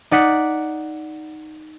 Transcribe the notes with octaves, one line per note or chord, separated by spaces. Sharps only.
D#4 D5 F#5 B6